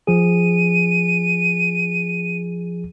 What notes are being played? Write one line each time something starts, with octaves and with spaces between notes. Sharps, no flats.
F3 G#4 D#7